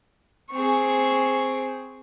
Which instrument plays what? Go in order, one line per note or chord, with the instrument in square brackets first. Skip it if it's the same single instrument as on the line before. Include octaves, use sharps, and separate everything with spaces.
[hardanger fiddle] C4 G#4 [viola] C#6